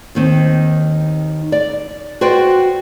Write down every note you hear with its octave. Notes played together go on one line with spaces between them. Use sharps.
D#2 D#3 C4
D5
F#4 B4 C5 D5 G5